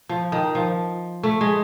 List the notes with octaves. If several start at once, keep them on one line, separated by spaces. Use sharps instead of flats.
F3
D#3
F3
A3
G#3